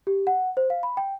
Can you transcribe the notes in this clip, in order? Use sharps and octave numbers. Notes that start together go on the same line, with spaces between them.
G4
F#5
C5
F5
B5
G5